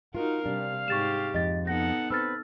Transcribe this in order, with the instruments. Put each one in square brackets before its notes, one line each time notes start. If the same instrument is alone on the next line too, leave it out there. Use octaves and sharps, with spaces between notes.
[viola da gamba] D#4 F#4 A#4 [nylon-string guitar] F4 [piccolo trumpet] F5
[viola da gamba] C3 G3 [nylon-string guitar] D4
[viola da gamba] G#2 G4 [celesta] C#6 A6 E7
[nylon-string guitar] F2 [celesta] D#5 A6
[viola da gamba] B3 D#4 A4 [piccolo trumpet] F#5 [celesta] A#6
[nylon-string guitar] C4 [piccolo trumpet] B4 [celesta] E6 F6 A6